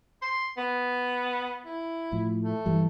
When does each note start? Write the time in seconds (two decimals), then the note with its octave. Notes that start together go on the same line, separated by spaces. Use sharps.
0.22 C6
0.57 B3
1.66 E4
2.12 A2 F3
2.43 A3
2.66 G2 E3 G3